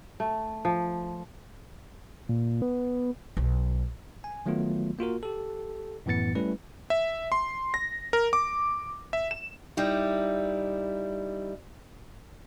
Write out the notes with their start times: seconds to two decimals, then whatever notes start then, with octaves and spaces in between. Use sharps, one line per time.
0.20 A3
0.65 F3
2.29 A#2
2.62 B3
3.37 B1
4.24 G#5
4.46 D#3 F#3 A3 B3 F4
4.99 A#3 F4 F#4 A#4
5.23 G4 A4
6.06 F#2 A2 E3 B3 A6 C#7
6.35 G3 A3 C#4 E4 B4
6.90 E5
7.32 C6
7.74 A#6
8.13 A#4
8.33 D6
9.13 E5
9.31 E7
9.77 G3 D#4 E4